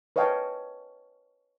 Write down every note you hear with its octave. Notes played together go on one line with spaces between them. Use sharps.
B4 C#5 D#5 F5 G5 A5